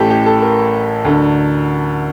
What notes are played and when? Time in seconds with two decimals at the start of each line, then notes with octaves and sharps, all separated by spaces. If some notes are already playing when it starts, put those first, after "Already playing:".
Already playing: A1 A2 E3 G4 A4
0.10 G4
0.26 A4
0.42 A#4
1.05 D2 D3